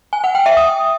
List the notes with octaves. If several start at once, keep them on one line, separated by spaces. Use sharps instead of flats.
G#5
F#5
G5
E5
D#6